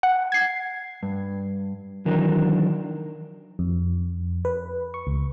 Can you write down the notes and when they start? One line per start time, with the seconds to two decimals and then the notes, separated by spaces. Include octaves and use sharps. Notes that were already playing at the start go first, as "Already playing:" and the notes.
0.03 F#5
0.32 G#6 C7
1.03 G2
2.06 D#3 E3 F#3 D4 A#4
3.59 F2
4.45 B4
4.94 C#6
5.07 C#2